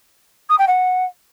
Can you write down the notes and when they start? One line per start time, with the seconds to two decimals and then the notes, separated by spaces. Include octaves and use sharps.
0.49 D#6
0.58 G5
0.67 F#5